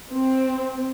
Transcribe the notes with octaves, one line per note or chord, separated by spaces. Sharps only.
C4